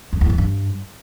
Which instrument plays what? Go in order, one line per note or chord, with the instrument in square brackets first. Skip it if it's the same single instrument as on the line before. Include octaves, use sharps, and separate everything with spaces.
[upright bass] F2
E2
A2
G2